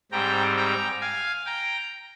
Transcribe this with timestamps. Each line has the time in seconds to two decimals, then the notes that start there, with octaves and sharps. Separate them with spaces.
0.12 G#2 G3 C4 G5 A#5
0.57 G5 A#5
1.01 F5 G#5
1.45 G5 A#5